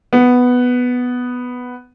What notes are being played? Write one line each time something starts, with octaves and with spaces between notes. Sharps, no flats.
B3